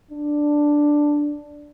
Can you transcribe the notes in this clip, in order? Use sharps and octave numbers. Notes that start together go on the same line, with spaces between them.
D4